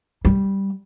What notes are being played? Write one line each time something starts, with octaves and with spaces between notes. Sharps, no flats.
G3